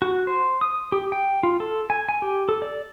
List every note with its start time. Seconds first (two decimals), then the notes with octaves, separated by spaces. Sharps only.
0.02 F#4
0.27 C5
0.61 D#6
0.92 G4
1.12 G5
1.43 F4
1.60 A4
1.90 G#5
2.09 G#5
2.22 G4
2.49 A4
2.62 D5